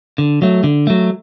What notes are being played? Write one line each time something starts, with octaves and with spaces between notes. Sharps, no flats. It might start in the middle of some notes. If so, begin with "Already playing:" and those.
D3
F#3 A3
D3
F#3 A3